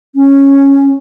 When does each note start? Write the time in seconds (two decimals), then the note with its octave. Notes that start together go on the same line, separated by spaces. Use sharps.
0.15 C#4